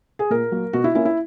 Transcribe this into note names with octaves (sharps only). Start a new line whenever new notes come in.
G#4
A#2 A#4
F#3 A#3
B2 F#4
E4
A#3 C#4 E4
E4